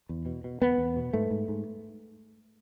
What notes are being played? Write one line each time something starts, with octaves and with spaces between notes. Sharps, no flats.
E2
B2
B2
E2 B3
E2
B2
G#2 A3
G#2
G#2